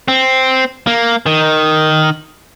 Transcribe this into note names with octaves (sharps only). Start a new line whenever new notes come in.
C4
A#3
D#3